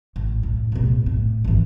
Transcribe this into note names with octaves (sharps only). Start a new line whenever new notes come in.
A1
A2
D1 B2
A2
G#1 E3